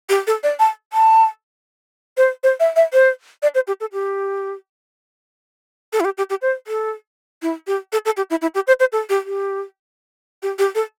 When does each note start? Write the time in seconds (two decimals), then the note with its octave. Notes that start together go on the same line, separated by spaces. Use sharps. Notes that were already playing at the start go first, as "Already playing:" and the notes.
0.09 G4
0.27 A4
0.43 D5
0.59 A5
0.93 A5
2.17 C5
2.43 C5
2.60 E5
2.76 E5
2.93 C5
3.42 D5
3.55 C5
3.67 G4
3.80 A4
3.93 G4
5.93 A4
6.00 E4
6.05 G4
6.17 G4
6.30 G4
6.42 C5
6.67 A4
7.42 E4
7.67 G4
7.92 A4
8.05 A4
8.17 G4
8.30 E4
8.41 E4
8.55 G4
8.67 C5
8.80 C5
8.92 A4
9.09 G4
9.25 G4
10.42 G4
10.58 G4
10.75 A4